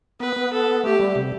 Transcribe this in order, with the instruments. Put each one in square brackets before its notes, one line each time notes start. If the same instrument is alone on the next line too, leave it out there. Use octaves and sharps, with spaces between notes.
[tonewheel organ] B3 [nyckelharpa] B4
[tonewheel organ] B3
[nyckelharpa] A4
[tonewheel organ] A3 [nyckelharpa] G4
[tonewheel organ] G3
C3